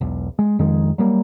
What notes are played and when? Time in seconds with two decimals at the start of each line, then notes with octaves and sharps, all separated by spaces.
0.01 E1 B1
0.39 G#3
0.59 F2 D#3 G#3
0.98 F#3 G3 A#3